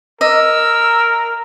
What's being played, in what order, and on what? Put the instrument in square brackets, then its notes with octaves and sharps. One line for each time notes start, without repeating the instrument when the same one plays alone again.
[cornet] A#4 [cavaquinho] D#5 [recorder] E6